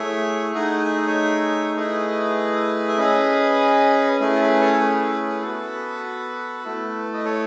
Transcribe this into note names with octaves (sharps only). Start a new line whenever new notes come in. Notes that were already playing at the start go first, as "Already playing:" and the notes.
Already playing: A3 E4 G#4 C#5 E5
A3 D#4 G#4 D#5 F#5
E5
D#5
C#5 E5
A3 E4 G#4 B4 D#5
E5
C#4 G#4 B4 D#5
A3 C#4 E4 G#4
A4
B4
A4 C#5
A4
B4
B3 F#4 A4
A3 E4 A4
D#5
A4 C#5